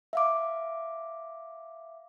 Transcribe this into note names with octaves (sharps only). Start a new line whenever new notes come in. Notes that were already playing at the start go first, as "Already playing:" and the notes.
E5 F5 D6